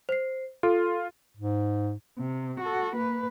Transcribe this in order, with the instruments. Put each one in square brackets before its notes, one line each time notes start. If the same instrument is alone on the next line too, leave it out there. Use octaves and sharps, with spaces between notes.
[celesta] C5 C7
[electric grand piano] F4 [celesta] A4
[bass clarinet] G#2
[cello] C3
F#4 A4
A#3 B4